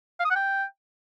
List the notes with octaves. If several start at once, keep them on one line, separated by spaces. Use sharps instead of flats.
F5
D#6
F#5
G5